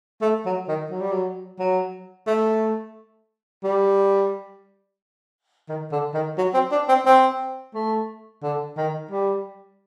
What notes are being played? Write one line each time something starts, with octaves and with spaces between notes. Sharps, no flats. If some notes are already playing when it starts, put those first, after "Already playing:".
A3
F#3
D#3
F#3
G3
F#3
F#3
A3
G3
D#3
D3
D#3
F#3
C4
D4
C4
C4
A3
D3
D#3
G3